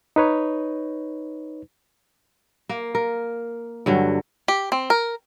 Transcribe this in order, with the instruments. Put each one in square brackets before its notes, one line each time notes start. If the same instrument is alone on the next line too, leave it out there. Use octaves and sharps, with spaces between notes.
[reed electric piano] D#4 B4 C#5
[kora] A#3
A#4
G2 D3 F#3
[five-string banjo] G4
C4
A#4